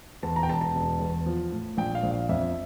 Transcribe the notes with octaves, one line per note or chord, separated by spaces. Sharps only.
E2 A5
A#5
G5
E1 A5
A5
E1
E2
F3
A2
A#1 G5
F5
A#1
F5
F2 E5